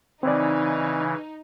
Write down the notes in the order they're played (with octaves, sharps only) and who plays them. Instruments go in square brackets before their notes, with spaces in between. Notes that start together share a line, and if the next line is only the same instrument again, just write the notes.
[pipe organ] C#3 E3 [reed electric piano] C4 D5 [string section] D#4